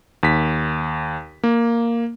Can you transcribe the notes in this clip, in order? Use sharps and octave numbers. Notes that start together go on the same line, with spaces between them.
D#2 B6
A#3